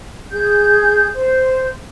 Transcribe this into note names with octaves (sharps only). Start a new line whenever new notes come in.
G#4 G6
C5